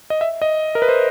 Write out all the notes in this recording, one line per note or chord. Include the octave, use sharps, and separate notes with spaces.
D#5
E5
D#5
A#4
B4
C5